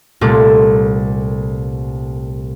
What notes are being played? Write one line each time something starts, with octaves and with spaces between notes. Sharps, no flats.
C2 A#2 A3 D6